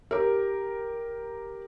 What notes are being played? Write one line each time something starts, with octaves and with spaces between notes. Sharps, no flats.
G4 A#4